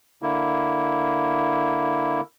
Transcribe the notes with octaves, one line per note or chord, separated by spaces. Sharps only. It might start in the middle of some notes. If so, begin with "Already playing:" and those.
D3 A#3 E4